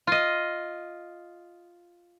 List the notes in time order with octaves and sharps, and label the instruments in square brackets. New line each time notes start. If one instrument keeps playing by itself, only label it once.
[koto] F4 D#5